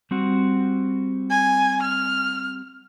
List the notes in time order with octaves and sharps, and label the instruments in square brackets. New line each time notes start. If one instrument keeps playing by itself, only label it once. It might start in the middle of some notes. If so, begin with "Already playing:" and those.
[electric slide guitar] G3 C4 F#4
[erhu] G#5
F6